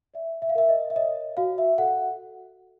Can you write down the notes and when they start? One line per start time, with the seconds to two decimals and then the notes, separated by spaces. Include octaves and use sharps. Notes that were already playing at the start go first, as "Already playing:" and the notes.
0.14 D5 E5
0.42 E5
0.49 F5
0.55 A#4 E5
0.69 D#5
0.90 E5
0.95 C#5 D#5
1.37 F#4 F5
1.58 E5
1.78 A4 F#5